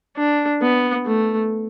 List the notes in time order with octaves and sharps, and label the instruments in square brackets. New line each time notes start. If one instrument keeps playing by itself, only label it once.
[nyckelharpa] D4
B3
A3